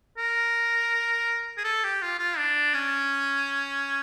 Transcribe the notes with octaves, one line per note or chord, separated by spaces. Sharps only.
A#4
G#4
A4
G4
F4
F4
D4
C#4